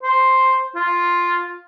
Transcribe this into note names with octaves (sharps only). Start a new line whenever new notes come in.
C5
F4